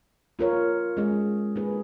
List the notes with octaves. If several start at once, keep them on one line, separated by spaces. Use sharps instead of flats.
A#3 F4 A#4 C#5
G#3 C#4 G#4 D#5
A#3 D#4 G#4 B4